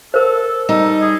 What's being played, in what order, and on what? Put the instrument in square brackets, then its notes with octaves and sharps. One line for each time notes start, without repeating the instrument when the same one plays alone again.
[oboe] A4 [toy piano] A#4 C5
[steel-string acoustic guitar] G3 D#4 [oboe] A4
[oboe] G#4